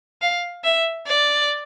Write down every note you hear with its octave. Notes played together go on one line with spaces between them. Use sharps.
F5
E5
D5